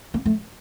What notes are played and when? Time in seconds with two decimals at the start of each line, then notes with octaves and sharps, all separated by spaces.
0.14 A#3
0.26 A3